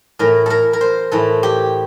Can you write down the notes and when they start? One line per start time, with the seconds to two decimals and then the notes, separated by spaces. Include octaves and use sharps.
0.19 A2 E3 A#4
0.46 A4 A#4
0.73 A#4
0.81 C5
1.12 A2 E3 A4
1.43 G4